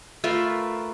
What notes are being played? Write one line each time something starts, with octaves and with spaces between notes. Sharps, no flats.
A3 F4 A#4 B4